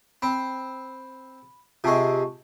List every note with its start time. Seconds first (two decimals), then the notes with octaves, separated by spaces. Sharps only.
0.22 C4 B5
1.84 C3 G#3 F4 A5 C#6